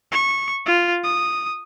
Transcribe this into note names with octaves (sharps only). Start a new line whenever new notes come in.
C#6
F4
D#6